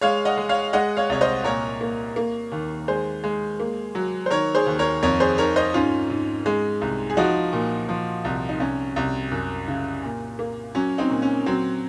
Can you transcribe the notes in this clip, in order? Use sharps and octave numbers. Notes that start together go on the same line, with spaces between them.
G#3 C#5 F5
D#5 F#5
G#3
C#5 F5
G#3 D#5 F#5
C#5 F5
C2 C#5
C5 D#5
A#2 A#4 C#5
A#3
A#3
D#2
G#3 G#4 C5
G#3
A#3
F#3
C5
D#3 A#4 C#5
G#4 C5
D#2
A#4 C#5
F2 A#4 C#5
G#4 C5
D#3 A#4 C#5
C5 D#5
G#2 C#4 F4
G#2
G#3
C2
G#4
F3 D#4 F#4
A#2
F3
C2
D#4
C2 C#4
C2
F#2
C#3
A#2
A#3
F#3 C#4
C4 D#4
A#2
C#4
F#3 C4